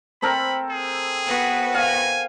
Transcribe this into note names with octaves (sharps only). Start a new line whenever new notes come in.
C4 A4 A#4 B5
G#4
B3 F#4 B4
F5 G#5